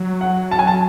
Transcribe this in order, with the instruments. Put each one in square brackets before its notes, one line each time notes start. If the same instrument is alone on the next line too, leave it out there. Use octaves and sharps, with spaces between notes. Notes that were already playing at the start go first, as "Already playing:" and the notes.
Already playing: [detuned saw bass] F#3
[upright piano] F#5
A5
G#5
A5